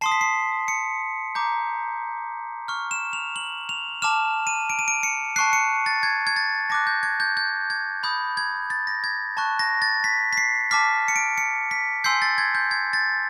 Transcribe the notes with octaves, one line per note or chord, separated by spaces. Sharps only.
A5 C6 D#6 C7
B6
C7
C#7
A#5 D6 G6
C#6 F6
E7
F7
F#7
F7
A5 D6 F6 E7
D#7
D7
D#7
D7
C#7
A5 C#6 F#6 C7
C#7
A6
G#6
G#6
A6
A5 D6 F#6 A#6
G6
G#6
G6
G6
G#6
B5 D#6 G6
G#6
A6
A#6
G#6
A5 C#6 F#6
A#6
A6
B6
B6
C7
A5 D6 F6 B6
C#7
D7
C#7
B6
G#5 C6 E6 G6 C7
A6
G#6
G6
G#6
A6